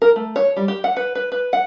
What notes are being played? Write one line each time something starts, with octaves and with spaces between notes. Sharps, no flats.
A#4
A3
C#5
G3
G4
F#5
B4
B4
B4
F#5